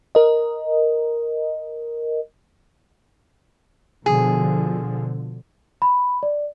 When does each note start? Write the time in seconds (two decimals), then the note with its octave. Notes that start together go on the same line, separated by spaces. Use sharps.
0.15 A#4 D#5
4.06 B2 D3 F3 G#4
5.82 B5
6.23 D5